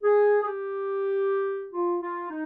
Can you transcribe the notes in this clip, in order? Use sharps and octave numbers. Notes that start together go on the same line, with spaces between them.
G#4
G#4
G4
F4
F4
D#4